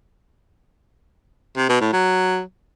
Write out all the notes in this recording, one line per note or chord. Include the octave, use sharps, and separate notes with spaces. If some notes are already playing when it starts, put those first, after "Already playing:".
C3
B2
A2
F#3